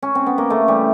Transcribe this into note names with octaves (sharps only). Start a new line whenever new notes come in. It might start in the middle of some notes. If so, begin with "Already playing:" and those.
C#4
C4
B3
A#3
C#3 A3
E3 G3